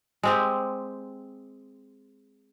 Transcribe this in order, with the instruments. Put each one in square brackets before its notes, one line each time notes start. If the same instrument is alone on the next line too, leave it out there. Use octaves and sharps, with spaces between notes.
[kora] G#3 C4 G4